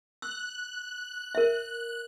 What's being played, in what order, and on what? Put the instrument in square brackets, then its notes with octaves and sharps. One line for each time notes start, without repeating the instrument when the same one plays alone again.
[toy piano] E6 [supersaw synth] F#6
[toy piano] A#4 E5